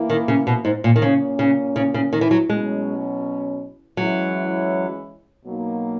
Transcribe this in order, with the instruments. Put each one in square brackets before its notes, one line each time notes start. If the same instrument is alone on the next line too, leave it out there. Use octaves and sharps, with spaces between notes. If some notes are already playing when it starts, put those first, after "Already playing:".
Already playing: [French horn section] E3 A#3 E4
[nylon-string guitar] D#3
C#3
B2
G#2
A#2
D#3
[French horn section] A#2 A#3 C#4 [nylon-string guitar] C#3
[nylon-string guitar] C#3
C#3
C#3
D#3
E3
F#3
[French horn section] B2 F#3 C#4 [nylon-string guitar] G#3
[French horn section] E3 G#3 C#4 E4 [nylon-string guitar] F#3
[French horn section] B2 F#3 A#3 D#4